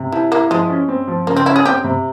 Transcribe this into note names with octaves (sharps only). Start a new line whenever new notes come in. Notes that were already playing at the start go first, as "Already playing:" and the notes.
Already playing: C3
F3 E4
A#3 E4
F3 G#3
C#4
C4
F3
C#3 A#3
C4
C#4 E4
G#4
C4 G4
C3